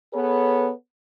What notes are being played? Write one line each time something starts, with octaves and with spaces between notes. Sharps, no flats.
B3 G#4 A4 B4 C#5